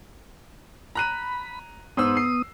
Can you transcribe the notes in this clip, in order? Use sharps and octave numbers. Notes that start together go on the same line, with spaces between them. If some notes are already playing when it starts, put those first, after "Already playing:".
A#5 B5 F#6 D#7
G#2 B3 C5 D#6 E6
C7